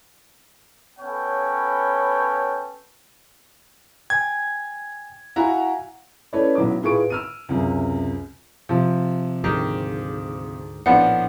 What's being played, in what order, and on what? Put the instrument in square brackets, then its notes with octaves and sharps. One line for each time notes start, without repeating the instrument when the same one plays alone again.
[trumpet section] B3 C#4 A4 B4 C#5 G5
[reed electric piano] G5 G#5 [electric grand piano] G#6
[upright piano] E4 F#4 A#5 [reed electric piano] F5 F#5 G#5
[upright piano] A3 C#4 E4 B4 C#5 D5
B1 F#3 E4 D6
A2 F4 G#4 B4 C#6 D7
E6 F6 D#7
C#2 F#2 C3
[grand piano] C3 F3
[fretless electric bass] D2 G#2 [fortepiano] D#3 G4
[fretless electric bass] A#1 A2 [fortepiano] F3 B3 D4 [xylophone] F#5